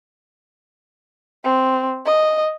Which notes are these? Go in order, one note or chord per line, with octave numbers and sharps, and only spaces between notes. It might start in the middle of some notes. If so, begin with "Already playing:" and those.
C4
D#5